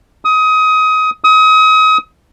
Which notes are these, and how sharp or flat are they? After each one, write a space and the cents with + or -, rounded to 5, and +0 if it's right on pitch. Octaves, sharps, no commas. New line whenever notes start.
D#6 +25
D#6 +35